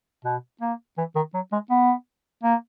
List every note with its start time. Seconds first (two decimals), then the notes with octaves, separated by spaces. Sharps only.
0.25 B2
0.61 A#3
0.98 E3
1.15 D#3
1.34 F#3
1.52 G#3
1.70 B3
2.43 A#3